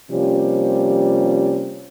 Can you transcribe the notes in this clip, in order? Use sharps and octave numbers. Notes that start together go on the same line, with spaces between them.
C3 F3 G3 A#3 C#4